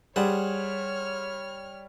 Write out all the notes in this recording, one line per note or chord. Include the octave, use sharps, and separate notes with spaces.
G3 G#4 C5 C#5 F#5 F6